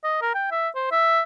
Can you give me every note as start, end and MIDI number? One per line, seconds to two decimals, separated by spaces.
0.04 0.21 75
0.22 0.32 70
0.34 0.50 79
0.51 0.68 76
0.75 0.89 72
0.91 1.21 76